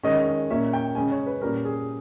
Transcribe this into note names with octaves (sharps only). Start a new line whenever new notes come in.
D#3 G#3 C#4 D#5
D#5
A#2 A#3 C#4 E5
G5
C#3 G#3 C#4 G#5
C#5
B4
A#2 G3 C#4 A#4
G#4